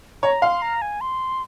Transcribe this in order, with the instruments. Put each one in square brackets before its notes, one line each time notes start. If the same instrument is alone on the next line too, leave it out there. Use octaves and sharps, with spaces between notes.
[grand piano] C#5 [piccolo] A#5
[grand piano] F5 [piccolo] C6
[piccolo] A#5
G#5
C6